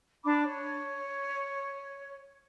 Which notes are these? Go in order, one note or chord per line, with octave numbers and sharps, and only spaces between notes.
D4 B5 D6
C#5